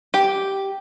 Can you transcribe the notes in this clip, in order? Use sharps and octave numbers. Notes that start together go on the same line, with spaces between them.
G4